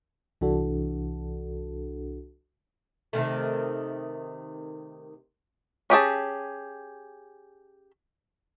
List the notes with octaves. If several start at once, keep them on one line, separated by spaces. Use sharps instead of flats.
C2 E3 D4 F#4 A4
C3 D#3 A3
C#4 G4 G#4 A5